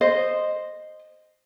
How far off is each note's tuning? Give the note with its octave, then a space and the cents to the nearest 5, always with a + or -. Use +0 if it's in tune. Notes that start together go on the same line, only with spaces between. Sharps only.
C5 +0 D#5 -10